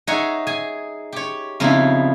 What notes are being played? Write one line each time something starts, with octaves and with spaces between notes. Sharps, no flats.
D#4 G#4 C#5 E5 F#5 G#5
G#4 G#5
G4 C#5
F2 C#3 B3 D#4 E4